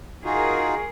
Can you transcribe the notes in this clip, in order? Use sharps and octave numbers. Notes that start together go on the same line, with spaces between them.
D#4 F4 F#4 G#4 A#4